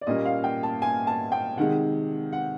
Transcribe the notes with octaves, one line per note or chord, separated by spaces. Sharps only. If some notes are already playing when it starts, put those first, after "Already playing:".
D5
A#2 G3 A#3 C#4 D#5
F5
G5
A5
G#5
A5
G5
C3 D#3 G#3 F#5
F#5